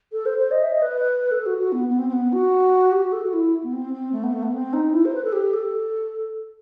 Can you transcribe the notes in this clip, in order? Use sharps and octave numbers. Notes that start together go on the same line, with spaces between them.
A4
C5
C5
D#5
E5
D#5
B4
A4
F#4
F#4
B3
B3
C4
C4
B3
F#4
G4
F#4
A4
F#4
E4
B3
C4
C4
A3
B3
A3
B3
C4
D#4
E4
C5
B4
A4
G4
A4